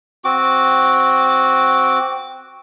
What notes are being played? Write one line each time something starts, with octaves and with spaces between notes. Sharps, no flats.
C4 F#4 D6